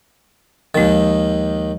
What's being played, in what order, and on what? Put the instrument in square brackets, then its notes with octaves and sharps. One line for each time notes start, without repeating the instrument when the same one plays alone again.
[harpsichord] D#2 D#3 [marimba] F3 G#3